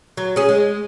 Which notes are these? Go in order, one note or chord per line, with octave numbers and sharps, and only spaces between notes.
F#3
C#4 G#4
G#3